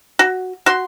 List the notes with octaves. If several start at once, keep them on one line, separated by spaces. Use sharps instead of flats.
F#4
F#4 C6